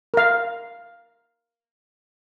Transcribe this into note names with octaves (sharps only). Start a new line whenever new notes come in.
A#4 F5